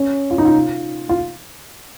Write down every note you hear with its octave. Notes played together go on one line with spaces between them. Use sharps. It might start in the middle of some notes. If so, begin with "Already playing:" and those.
Already playing: C#4
F4
D#4
F4
F4